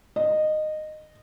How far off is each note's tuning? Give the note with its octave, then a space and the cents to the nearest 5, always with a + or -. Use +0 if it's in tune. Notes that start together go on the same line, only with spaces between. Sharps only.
D#5 -15